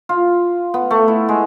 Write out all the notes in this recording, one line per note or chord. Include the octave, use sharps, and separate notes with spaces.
F4
B3
A3
E4
G#3